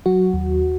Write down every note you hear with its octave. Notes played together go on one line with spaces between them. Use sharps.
F#3 F#4
D#2